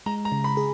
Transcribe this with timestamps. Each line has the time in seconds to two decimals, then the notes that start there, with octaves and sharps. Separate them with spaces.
0.06 G#3 A#5
0.25 A#5
0.32 C#3
0.44 B5
0.57 G#4